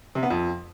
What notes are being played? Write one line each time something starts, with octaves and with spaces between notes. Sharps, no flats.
C3
B3
F2